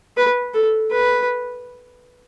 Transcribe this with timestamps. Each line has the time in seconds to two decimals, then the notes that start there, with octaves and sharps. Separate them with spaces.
0.17 B4
0.54 A4
0.91 B4